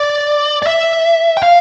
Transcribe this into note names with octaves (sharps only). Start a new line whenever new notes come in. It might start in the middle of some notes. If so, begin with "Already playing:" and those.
Already playing: D5
D5
E5
G5
F5